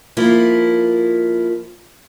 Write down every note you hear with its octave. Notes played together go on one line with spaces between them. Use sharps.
F3 A#3 E4